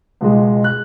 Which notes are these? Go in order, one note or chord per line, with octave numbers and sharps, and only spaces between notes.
C#2 B2 G#3
F#6